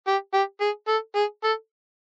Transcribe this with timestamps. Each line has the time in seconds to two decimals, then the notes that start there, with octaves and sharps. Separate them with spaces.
0.07 G4
0.33 G4
0.61 G#4
0.88 A4
1.15 G#4
1.44 A4